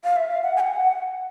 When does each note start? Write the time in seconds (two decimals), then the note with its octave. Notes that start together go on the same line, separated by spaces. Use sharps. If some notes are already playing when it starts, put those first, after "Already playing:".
0.04 F5
0.16 E5
0.30 F5
0.43 F#5
0.57 G#5
0.60 F#5